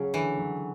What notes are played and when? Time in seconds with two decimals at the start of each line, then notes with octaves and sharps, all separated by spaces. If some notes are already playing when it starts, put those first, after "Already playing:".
Already playing: C#3 F#3 C#4
0.14 D3 E3
0.38 F#3